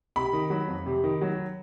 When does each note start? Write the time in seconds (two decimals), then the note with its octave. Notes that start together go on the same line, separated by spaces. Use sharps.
0.16 C3 B5
0.33 D#3
0.50 F#3
0.68 F2
0.86 C3
1.04 D#3
1.21 F#3